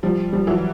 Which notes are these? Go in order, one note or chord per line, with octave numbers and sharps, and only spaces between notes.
F3 G3
F3 G3
E3 F#3